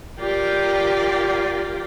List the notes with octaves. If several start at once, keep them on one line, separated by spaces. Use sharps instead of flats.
F4 G4 A#4 D5 G5